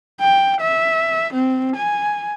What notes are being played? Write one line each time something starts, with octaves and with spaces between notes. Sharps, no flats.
G5
E5
C4
G#5